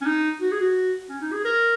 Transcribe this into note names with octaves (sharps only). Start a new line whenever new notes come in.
C#4
D#4
F#4
G#4
F#4
C#4
D#4
G#4
A#4